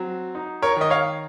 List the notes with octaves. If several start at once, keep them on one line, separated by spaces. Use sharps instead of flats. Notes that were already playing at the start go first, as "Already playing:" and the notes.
Already playing: F#3 C4
D#4
A#4 C#5
D#3 D#5
C#5 F5